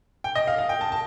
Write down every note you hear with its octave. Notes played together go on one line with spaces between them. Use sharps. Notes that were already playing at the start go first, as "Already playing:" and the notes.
G5
D#5
F5
F5
G5
A5
A5